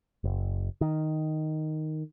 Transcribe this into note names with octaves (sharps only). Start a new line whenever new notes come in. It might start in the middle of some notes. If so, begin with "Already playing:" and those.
F#1
D#3